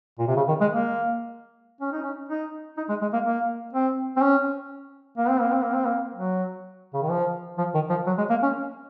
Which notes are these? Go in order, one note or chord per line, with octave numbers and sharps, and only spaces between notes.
A#2
C3
C#3
D#3
G#3
A#3
C#4
D#4
C#4
D#4
D#4
G#3
G#3
A#3
A#3
C4
C4
C#4
A#3
C4
A#3
C4
A#3
C4
A#3
F#3
C#3
D#3
F3
F3
D#3
F3
F#3
G#3
A#3
C#4